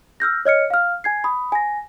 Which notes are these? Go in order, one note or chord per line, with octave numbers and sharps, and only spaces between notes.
E6 F6 G6 A#6
C#5 D#5 F6 C#7
F5 F6
G#5 G#6 C7
B5 D#6
G#5 A#6